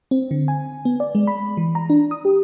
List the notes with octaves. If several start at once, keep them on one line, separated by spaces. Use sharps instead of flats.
C4
D3
G#5
B3
D5
G#3
B5
E3
A#5
D4
D#6
G4